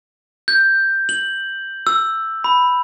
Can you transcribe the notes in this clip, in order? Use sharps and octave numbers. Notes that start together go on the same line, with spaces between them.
G6
F#7
E6
B5